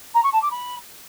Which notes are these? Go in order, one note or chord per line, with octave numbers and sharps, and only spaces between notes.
A#5
C#6
A5
D6
B5